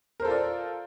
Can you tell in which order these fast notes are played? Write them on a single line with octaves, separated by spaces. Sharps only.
A#4 C5 A4 F4 D5